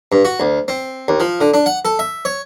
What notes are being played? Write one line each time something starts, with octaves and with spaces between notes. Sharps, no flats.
G2
F#4
D2
C4
D#2
F3
D3
D4
F#5
A4
E5
C#5